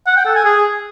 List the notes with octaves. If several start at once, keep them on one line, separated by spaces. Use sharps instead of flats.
F#5
G5
A4
G#5
G#4